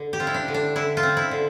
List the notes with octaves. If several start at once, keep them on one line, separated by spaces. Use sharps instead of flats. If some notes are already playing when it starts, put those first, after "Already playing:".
Already playing: D3
G4
C4 F4
E4
D4
D3
D4
D3 E4
F4
C4
E4
D3